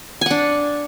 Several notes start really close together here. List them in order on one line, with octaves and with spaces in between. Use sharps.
G#5 F#5 D4